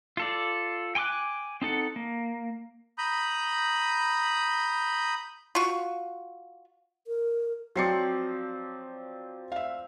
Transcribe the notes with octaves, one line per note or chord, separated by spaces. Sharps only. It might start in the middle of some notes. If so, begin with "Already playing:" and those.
F4 A4 D5
G5 G#5 C6 D6 F#6
C4 D#4 A4 F#5
A#3
A#5 B5 D#6 G6
F4 F#4
A#4
F3 F#3 C4 D5 C7 C#7
E5 F5